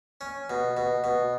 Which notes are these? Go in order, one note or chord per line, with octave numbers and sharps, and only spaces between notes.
C#4
B2
B2
B2